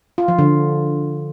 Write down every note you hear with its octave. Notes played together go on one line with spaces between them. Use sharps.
F4
F3
D3